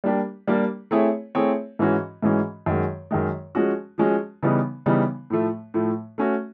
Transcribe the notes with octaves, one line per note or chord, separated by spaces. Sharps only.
G3 A#3 D4 G4
G3 A#3 D4 G4
A3 C4 E4 G#4 C#5
A3 C4 E4 G#4 C#5
G#2 E3 G#3 C#4 F#4
G#2 E3 G#3 C#4 F#4
F#2 D#3 G#3
F#2 D#3 G#3
F3 G#3 C#4 F#4
F3 G#3 C#4 F#4
C#3 E3 G3 B3 D#4
C#3 E3 G3 B3 D#4
A2 F3 A3
A2 F3 A3
A3 C#4 F#4